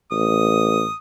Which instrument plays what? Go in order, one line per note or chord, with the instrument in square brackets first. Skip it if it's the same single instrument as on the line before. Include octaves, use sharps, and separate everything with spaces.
[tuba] A1 [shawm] D#6